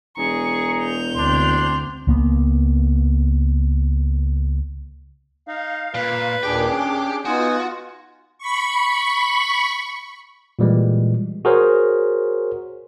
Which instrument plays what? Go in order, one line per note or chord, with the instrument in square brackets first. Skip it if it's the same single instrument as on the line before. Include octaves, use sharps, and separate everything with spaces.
[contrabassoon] E1 [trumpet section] G#4 A#5 [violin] C#6
[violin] G6 F7
[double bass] D2 C4 [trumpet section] D4 C6
[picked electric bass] C#2 A#3 B3
[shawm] D#4 [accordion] F5
[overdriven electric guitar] A#2 [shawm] B4
[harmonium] D#2 A#2 [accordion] D4 G#4 D6 [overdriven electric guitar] G4 G5
[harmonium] C#4
[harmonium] B3 D#4 G#5 [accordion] F4 [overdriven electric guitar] F#4 [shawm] D#6
[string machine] B5 C#6
[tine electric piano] A#2 E3 G3 G#3
F#4 G#4 A#4 C5 C#5